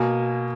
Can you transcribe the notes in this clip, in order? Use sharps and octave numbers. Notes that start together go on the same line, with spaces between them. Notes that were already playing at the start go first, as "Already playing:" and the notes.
Already playing: B2 A#3 G#5